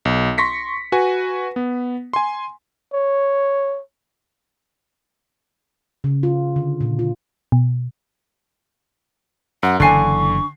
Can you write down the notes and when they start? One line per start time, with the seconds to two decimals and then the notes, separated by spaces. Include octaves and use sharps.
0.05 B1
0.38 C6 C#6 A#6 B6 C#7
0.92 F#4 B4 G#5
1.56 B3
2.13 G#5 C6
2.94 C#5
6.04 C#3
6.23 F4
6.56 D3
6.81 A#2
6.99 F4
7.52 B2
9.63 F#2 F#5
9.80 F#1 D3 E3 D4 G#5 C#6 C7